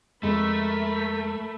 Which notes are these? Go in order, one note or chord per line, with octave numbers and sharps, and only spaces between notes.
F2 G#3 A3 A#4 B5